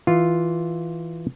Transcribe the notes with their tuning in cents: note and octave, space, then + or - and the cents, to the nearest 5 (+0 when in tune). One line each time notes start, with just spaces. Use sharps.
E3 -5 F4 +0